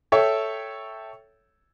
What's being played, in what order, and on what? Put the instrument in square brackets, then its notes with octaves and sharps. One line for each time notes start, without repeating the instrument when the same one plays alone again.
[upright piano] A4 C#5 E5 G5